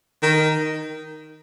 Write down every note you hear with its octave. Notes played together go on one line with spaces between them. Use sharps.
D#3